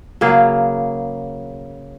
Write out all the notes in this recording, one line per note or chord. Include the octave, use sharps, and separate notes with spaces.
C#3 F#3 A#3 G#4